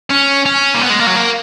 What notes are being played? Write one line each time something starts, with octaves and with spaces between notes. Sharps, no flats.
C#4
C#4
A#3
B3
G#3
A#3
F#3
A#3